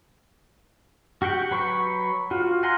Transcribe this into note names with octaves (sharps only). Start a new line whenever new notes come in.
F#4 G4 F#5 G5
F#3 B4 C#6
F4 F#4
F5 F#5 G#5 A#5 C6